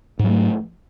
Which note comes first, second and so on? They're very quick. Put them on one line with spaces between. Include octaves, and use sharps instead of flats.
G#2 F#3 A3